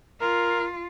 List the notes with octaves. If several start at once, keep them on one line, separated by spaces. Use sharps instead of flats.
F4 A#4